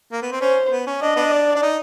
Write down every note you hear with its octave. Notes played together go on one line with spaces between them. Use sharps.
A#3
B3
C4
C#4 C5
B3
C#4
D4 D#5
B3 D4
D5
D4
D#4